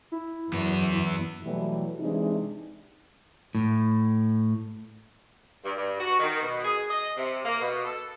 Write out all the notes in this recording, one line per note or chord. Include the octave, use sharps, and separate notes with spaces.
E4
F#2 E3 B3
B2 E3 F#3 G3 A3 E4
C3 E3 G#3 D4 D#4
A2
G2
G2
F#4
D#3
B2
G#4
D#5
C3
A#3
B2
A4